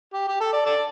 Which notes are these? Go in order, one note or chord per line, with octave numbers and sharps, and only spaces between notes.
G4
G4
A4
D5
A4 D5